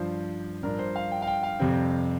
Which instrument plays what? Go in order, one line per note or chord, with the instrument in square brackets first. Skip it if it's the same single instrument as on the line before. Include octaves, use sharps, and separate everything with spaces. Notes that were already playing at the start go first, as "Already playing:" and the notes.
Already playing: [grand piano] G2 F3 D4 C5
G2 F3 D4 A#4
C5
F5
G5
F5
G5
F5
F2 C3 G3 C4